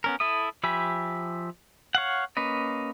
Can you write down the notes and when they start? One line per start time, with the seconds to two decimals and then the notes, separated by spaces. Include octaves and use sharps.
0.04 B3 C#4 A#4
0.20 E4 A4 E5 D#6
0.63 F3 G4 E5 G#5 B5
1.95 C#5 F5 F#5
2.37 A#3 C#4 B4 D#5